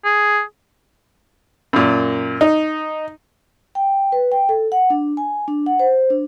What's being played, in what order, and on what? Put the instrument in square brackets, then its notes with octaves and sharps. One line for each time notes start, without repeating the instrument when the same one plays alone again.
[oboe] G#4
[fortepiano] F#2 A#2
D#4
[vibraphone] G5
B4
G5
A4
F#5
D4
G#5
D4
F#5
C5
D4